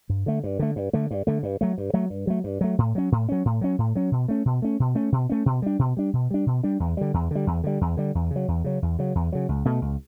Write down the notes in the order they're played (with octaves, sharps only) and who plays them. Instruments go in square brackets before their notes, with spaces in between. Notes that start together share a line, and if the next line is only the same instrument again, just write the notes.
[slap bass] G2
D3 A3
G2
D3 A3
G2
D3 A3
G2
D3 A3
G2
F#3 A3
G2
F#3 A3
G2
F#3 A3
G2
F#3 A3
A2
F#3 C#4
A2
F#3 C#4
A2
F#3 C#4
A2
F#3 C#4
B2
A3 C#4
B2
A3 C#4
B2
A3 C#4
B2
A3 C#4
B2
G3 D4
B2
G3 D4
B2
G3 D4
B2
G3 D4
E2
D3 G3
E2
D3 G3
E2
D3 G3
E2
D3 G3
E2
C#3
F#3
E2
C#3 F#3
E2
C#3 F#3
E2
C#3 F#3
C#2
B2 A3
C#2